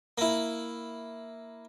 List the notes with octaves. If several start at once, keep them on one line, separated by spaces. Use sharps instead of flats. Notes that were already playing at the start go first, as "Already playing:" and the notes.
A#3 E4